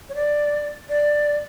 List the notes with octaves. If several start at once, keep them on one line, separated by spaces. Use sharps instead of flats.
C#5
D5
D5